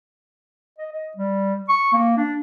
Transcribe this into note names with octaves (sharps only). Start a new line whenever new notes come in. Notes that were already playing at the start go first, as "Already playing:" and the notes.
D#5
D#5
G3
C#6
A#3
D4